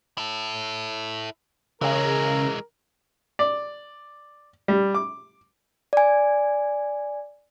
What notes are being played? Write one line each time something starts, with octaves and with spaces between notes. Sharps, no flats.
E4 A4
C#3 E3 G#3 A#4
D5
G3
D6
D5 G#5